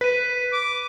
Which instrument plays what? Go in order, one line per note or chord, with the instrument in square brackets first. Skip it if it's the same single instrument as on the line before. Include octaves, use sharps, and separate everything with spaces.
[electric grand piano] B4 [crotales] B6 D#7
[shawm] D6